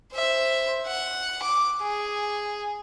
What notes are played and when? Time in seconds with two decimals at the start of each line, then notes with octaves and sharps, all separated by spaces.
0.14 C5 E5
0.87 F#5
1.43 D6
1.81 G#4